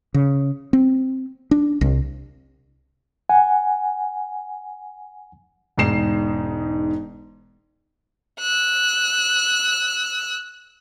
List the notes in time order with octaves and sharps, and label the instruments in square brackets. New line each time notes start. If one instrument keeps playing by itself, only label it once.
[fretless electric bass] C#3
C4
D4
C2
[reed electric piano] F#5 G#5
[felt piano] E1 G#2 D#4 C7 E7
[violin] E6 F#6